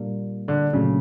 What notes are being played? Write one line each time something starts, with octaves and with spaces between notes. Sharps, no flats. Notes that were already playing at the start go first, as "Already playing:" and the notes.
Already playing: A#2 G3 A#3 D4
D3
A#2 C#3 F#3 A3 D4